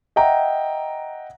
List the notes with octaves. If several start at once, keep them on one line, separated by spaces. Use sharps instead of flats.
D#5 E5 F#5 G5 A#5